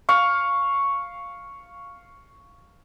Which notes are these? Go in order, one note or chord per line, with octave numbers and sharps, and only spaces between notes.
F5 C#6